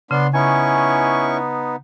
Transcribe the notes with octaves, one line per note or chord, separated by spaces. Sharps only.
C#3 B3 D4 C6
B3 C#4 D#4 E4 G#5 C#6